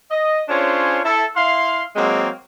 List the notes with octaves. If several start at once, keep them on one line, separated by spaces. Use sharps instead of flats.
D#5
C#4 D4 F4 G#4 C5 C#5
E4 A4
E4 F5 C6
F#3 G#3 A#3 C4